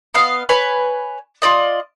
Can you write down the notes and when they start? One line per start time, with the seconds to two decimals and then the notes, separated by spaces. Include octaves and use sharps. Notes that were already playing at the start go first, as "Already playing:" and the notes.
0.14 B3 D#5 F5
0.49 B4 C#5 G#5
1.42 F4 G4 D5 D#5